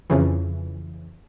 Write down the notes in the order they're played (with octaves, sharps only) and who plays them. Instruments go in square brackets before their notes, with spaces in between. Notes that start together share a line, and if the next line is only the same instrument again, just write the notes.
[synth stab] F2 C#3 E3